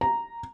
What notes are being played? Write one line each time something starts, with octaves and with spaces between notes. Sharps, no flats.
A#5